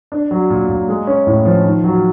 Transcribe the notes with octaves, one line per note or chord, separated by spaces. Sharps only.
D4
F#3
A#2
A#2
G#3
C#4
A2
F3
D#3
F#3